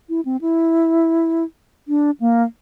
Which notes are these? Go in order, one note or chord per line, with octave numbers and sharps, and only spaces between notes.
E4
C4
E4
D4
A#3